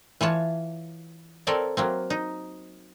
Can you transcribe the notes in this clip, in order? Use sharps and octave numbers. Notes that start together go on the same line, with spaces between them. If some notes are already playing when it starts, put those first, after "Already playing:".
E3 F4 C#5 A5
C4 A4 A#4 C#5 D5
F#3 A#3 C4
D#4